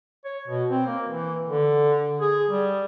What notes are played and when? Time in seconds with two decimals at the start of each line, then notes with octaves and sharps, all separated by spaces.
0.25 C#5
0.48 B2
0.70 C4
0.86 A#3
1.08 E3
1.48 D3
2.21 G#4
2.50 G3